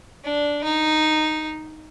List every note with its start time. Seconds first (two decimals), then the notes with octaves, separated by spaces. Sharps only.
0.24 D4
0.64 D#4